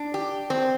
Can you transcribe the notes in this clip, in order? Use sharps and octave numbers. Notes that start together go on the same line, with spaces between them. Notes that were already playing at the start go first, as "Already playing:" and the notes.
Already playing: D4
G4
C4